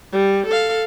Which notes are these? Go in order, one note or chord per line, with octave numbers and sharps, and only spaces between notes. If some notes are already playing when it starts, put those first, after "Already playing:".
G3
A4 F5